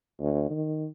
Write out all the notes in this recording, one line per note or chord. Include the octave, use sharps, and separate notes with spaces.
D2
D#3